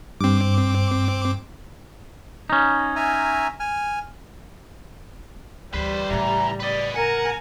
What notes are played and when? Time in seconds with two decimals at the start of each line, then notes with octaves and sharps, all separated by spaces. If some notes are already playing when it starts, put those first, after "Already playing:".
0.21 G2 C4 D6
2.50 C#4 D#4
2.96 E5 G#5 A#5
3.60 G#5 F6
5.74 D2 E3 G3 B4 C5
6.10 A2 C#3 E3 A#5
6.60 B4 D5 D#5
6.96 A#4 F#5 G#5 A#5